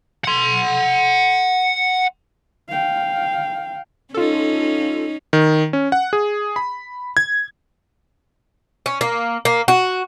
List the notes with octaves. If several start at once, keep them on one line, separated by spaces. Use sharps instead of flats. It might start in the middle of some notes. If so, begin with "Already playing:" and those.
F#5 C6
F5 G5
C#4 D#4 F4 A4
D#3
C#4
F#5
G#4
B5
G#6
C#4
A#3
A#3
F#4